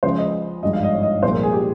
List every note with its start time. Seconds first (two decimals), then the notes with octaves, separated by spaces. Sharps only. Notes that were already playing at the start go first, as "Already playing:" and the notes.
0.03 C#2 C#3 F3 G#3 C5
0.18 D#5
0.62 G#1 G2 F3 G#3 D#5
0.73 F5
0.83 D#5
0.93 C#5
1.03 D#5
1.23 C2 A#2 F3 G#3 C5
1.33 A#4
1.43 G#4
1.53 G4